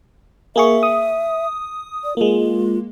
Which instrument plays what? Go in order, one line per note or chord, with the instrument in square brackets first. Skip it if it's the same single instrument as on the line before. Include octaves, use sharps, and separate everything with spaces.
[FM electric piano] A#3 G#4 C#6 [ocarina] E5
[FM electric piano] D#6
[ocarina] D5
[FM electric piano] G#3 A#3 [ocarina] F4